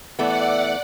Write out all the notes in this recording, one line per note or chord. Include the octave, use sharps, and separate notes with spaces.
E3 A3 B3 D5 F#5